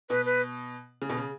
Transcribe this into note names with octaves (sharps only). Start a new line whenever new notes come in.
B2 B4
B4
C#3
B2
C#3